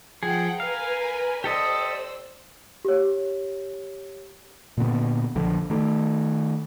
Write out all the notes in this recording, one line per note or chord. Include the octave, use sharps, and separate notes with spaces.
F3 G#4 F#5 G5
A#4 B4 F5 G#5
G4 A4 C5 D5 D#5 E6
G4 C#5
A#2 D3 B3
A#1 D3 F3
D#3 A3